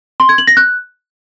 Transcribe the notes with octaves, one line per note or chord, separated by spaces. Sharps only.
C6
G#6
F#7
A#6
F#6